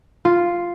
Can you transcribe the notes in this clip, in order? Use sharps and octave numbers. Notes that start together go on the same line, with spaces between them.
F4